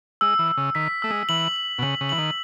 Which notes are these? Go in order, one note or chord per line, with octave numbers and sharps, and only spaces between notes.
G#3 E6
E3
E6
C#3
D#3 B6
A3 E6
G#3
E3 F#7
F#7
B2
C#3 F#7
C#3
E3 F#7
D#3